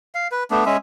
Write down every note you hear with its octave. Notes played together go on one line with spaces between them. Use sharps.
F5
B4
A3 B3 D4
G#3 C#4 E5